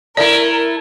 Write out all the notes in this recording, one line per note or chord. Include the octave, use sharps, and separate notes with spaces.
A3 E4 A#4 D5